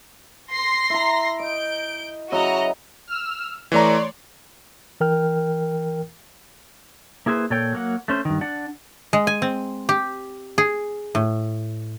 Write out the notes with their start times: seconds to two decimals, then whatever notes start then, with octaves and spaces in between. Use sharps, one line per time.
0.52 C6 A#6 C7
0.90 E4 A#5
1.40 D#5 G6 D7
2.32 C#3 F#3 E4 F#4 D#5 A#5
3.07 E6 F6
3.72 E3 A3 C#5 D5 A#5 C6
5.00 E3 A#4 G5 F6
7.26 A#3 E4 G#4 B4 C5
7.50 A#2 A4 C#5 G5
7.73 F#3 A#3 F#5
8.08 A3 C#4 C5
8.25 G2 D#3
8.41 D4 D5 F#5
9.13 G#3
9.27 G#5
9.42 C4
9.89 G4
10.58 G#4
11.15 A2